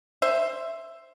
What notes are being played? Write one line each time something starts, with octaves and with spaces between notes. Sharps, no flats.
C5 E5